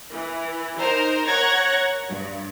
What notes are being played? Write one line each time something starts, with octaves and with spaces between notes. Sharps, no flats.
E3
D#4 A#4 C5 A#5
A#4 C#5 F#5 A#5 G#6 A#6
G2